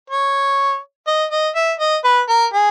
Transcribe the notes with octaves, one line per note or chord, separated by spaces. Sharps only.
C#5
D#5
D#5
E5
D#5
B4
A#4
G#4